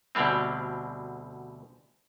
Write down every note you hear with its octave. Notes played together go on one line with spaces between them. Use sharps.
D2 B2 D3 G3 C4